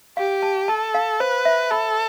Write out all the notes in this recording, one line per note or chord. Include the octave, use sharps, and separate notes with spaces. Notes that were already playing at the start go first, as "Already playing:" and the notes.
G4 F5
A5
A4 A5
F5
B4 C5
E5
A4 B5